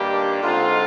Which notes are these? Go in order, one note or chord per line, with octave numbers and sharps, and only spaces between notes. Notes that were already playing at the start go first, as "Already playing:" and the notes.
Already playing: G2 D#3 G3 A#3 D4 G4
D3 G#3 C4 D#4 F4